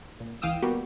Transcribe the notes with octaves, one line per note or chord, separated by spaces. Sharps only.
A#2
C#2 E3 F5 G5 D#6 E6
G3 A#3 B3 F#4 G4